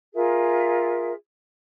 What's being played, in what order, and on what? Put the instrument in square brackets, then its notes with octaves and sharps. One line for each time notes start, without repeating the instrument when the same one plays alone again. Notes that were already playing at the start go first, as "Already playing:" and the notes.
[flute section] F4 G#4 A#4 E5